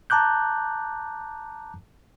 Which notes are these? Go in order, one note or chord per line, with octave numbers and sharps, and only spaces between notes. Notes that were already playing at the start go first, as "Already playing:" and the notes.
A5 A#5 D6 F#6 G6